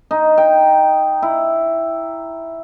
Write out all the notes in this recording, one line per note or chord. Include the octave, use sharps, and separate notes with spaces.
D#4
G5
E4